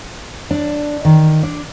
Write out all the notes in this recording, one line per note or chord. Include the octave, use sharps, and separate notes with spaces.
D4
D#3
D4